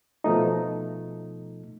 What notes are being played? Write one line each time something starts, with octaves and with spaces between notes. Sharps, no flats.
B2 F3 A3 D#4